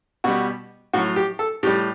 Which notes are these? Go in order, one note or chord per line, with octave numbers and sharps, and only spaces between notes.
B2 G3 F#4
A2 F#3 F#4
G4
A4
A2 G3 G4